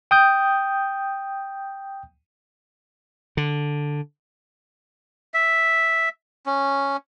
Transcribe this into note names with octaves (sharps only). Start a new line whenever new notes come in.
G5 D#6 G6
D3
E5
C#4